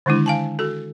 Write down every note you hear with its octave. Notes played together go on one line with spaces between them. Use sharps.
D3 D#3 G#3 D4 E4
F5 G#5 A5
F#4 A4